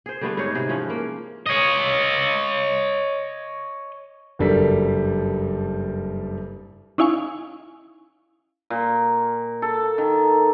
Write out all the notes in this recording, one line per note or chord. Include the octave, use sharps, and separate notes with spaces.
G#4 C5
D3 G3 A3 B3
G#2 D#4 G#4 C#5
C3 F#4 G#4
E3 F3 C#4
A#3
C#5 D#5
F#1 G2 G3 A4 A#4 B6
C#4 D#4 E4 F5 G#5 C#6
A#2
A4
D#3